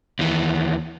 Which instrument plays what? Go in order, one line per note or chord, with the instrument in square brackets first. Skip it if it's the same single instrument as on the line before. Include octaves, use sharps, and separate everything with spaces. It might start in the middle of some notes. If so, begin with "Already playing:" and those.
[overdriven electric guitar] D#2 E3